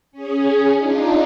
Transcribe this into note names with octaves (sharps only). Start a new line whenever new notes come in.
C#4 G#4
D4 D#4 F4